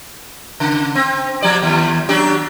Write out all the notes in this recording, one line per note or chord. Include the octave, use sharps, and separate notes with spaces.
C#3
C4
F3 G3 D5
D#2
F#3 D4 G4